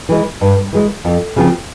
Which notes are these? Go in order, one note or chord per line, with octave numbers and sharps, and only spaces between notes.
E3 G#3
G2
E3 G#3
F2
C#3 F3 C4